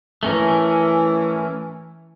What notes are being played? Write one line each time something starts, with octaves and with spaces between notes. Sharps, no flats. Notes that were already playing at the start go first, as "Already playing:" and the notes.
E3 A3 C#4 A#4